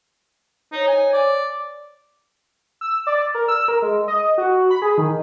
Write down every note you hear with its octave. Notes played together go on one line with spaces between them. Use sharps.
D#4 C5 C#5
G#5
D5
E6
D5
A#4
E6
A#4
G#3
D#5
F#4
B5
G#4
D#3